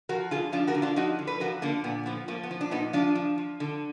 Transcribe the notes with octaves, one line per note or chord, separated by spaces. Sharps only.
F3 F#4 A#4
D3 F4 G#4
F3 D4 F4
F#4 A#4
D3
D4 F4
F3 D#4 F#4
D3
B4
F3 F#4 A#4
D3 A#3 D4
A#2 B3
F3 B3
F3 A#3
B3
F3
D4
A#2 B3 D#4
F3 D4 F4
F3
F3
D3